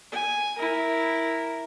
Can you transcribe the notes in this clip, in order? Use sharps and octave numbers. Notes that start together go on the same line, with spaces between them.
G#5
E4 A#4